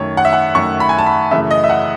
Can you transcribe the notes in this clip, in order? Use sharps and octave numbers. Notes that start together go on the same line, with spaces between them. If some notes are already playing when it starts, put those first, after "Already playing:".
Already playing: F#2 D#3 A3 C#5
F#5
E5
F#5
F#2 D#3 A3 C#6
B5
G#5
A5
B5
F#2 C#3 E3 A3 E5
D#5
E5
F#5